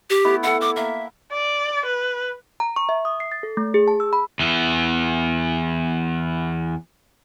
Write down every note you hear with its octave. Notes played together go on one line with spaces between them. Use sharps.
G4
A3 B3 E4
E4 A4 F#5
F#5 D6
A#3 E5
D5
B4
A#5
C#6
E5
D#6
C7
A6
A4
A3
G#4
A5
E6
B5
E2 E3